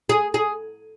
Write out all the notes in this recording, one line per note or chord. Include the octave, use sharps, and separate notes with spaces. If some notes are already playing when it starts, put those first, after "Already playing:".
G#4
G#4